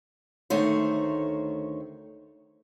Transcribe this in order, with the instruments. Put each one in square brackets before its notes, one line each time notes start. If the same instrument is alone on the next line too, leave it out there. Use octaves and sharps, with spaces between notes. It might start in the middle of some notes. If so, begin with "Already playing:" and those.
[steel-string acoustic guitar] D2 D#3 A3 C5 C#5